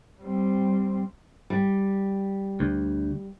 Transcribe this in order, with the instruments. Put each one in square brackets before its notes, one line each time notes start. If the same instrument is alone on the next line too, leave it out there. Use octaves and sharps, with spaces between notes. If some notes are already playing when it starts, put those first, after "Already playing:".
[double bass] G3 C4
[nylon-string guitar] G3
[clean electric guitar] D2